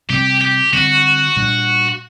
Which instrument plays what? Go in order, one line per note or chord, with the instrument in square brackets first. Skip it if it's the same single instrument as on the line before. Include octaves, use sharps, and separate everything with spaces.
[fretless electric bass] C3 G3 C4 [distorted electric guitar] G4
[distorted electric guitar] G4
[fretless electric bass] D3 G3 C4 [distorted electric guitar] F#4
[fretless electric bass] A#2 G3 D4